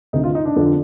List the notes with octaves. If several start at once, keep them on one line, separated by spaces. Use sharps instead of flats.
D2 C3 D#3 D#4
F4
D#4
D4
F2 D3 F3